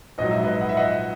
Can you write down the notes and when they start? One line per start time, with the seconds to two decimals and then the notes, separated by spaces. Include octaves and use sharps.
0.18 A#1 G#2 F#3 D#5
0.31 E5
0.44 B4 D#5
0.61 F#5
0.69 E5
0.77 D#5 F#5